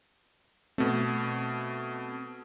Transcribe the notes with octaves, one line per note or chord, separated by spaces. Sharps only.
B2 A3 C4